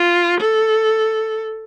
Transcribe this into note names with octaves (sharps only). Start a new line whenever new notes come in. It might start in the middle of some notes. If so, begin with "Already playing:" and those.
Already playing: F4
A4